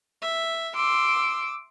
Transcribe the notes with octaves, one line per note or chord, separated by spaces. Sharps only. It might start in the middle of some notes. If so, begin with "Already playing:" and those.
E5
C6 D6 E6